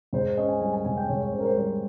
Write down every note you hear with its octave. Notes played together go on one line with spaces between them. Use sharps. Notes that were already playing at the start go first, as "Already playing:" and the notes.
G#2 C5
C5
C#4 D#5
G#5
G3 G#5
G#5
G#2 G#5
G5
G#2 C#5
C#5
C#4 C5
A#4
C5
G3 C5